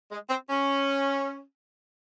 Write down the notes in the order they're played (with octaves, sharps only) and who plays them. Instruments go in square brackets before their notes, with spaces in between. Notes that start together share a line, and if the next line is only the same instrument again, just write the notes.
[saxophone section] G#3
C4
C#4